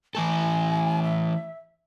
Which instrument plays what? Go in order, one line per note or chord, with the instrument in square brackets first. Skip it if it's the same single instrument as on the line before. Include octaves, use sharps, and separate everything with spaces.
[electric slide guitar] E3 A3 A4 [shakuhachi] G#5
[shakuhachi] E5